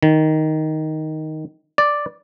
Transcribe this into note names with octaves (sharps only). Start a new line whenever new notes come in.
D#3
D5